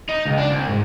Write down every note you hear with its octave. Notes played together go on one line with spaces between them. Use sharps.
D#4
C#2
D4
C2
G#2